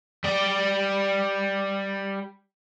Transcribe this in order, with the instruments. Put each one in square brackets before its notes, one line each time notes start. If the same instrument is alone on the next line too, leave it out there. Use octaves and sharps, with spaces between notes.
[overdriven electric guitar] G3 D5